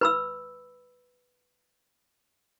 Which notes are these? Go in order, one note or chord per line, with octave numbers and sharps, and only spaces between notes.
B4 B5 E6